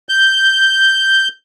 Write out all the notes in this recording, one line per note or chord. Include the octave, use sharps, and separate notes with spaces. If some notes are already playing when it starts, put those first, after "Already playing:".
G6